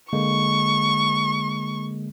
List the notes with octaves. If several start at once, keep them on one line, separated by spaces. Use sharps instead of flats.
D3 G#3 A#3 C#6